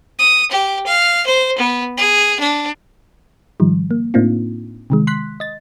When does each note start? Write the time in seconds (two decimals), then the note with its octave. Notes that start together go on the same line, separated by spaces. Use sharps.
0.19 D#6
0.51 G4
0.86 F5
1.26 C5
1.58 B3
1.97 G#4
2.40 D4
3.60 G#2 D#3 F3 G3
3.91 A#3
4.14 A2 A#3 C4 D4 D#4 F4
4.90 C3 D#3 G#3
5.07 C6 F#6 B6
5.40 D#5 A6